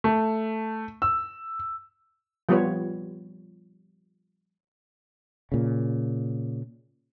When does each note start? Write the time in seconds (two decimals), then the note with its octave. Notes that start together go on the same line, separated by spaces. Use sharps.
0.04 A3
1.02 E6
2.49 F3 G3 B3 F4 B4 C#5
5.52 A#2 C#3